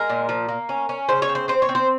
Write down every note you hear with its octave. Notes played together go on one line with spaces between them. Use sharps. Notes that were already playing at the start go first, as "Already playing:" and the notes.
Already playing: G#3 A#4
A#2
F3
A#3
C#4
C#4
C#3 C5
C#5
C4
C5
C4 C5
C#5
C4
C5